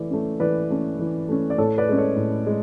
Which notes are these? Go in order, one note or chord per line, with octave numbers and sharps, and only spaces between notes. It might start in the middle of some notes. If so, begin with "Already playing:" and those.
Already playing: E3 A3 D5
A3 C#4
E3 B4 D5
A3 C#4
E3
A3 C#4
D5
A2 A4 C#5
B4 D5
G#3 C#4
A4 C#5
A2
G#3